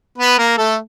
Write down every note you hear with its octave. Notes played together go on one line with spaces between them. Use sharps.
B3 B4
A#3 A#4
A3 A4